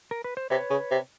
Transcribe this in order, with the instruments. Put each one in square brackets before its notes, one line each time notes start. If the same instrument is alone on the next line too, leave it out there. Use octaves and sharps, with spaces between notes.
[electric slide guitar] A#4
B4
C5
[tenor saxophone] C3 [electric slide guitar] B4 C#5
[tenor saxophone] C#3
C3